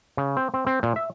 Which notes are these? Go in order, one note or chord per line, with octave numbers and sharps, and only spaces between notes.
C#3
C4
C4
C4
A#2
E5